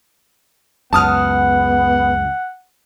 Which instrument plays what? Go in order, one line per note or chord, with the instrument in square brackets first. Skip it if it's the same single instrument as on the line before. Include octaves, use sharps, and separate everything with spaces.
[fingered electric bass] C#2 F#2 [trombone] B3 [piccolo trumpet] F#5 [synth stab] A5 D#6 F6